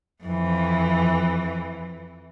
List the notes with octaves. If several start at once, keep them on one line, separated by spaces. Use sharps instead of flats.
F2 E3